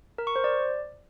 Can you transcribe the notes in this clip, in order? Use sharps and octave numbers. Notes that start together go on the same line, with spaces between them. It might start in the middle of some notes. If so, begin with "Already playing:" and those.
A#4
C#6
C5
D5